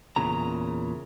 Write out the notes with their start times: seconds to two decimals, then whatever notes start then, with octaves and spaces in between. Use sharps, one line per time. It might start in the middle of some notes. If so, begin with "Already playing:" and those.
0.16 E2 A#2 C#3 A#5